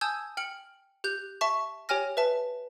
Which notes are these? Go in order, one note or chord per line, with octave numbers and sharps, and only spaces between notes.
G#5 A5 D#6 E6 G6 G#6
G5 F6 C#7 F#7
G4 F#6 G6
E5 A5 C#6
G4 C#5 G5 G#5 F6 A#6
B4 E5 A5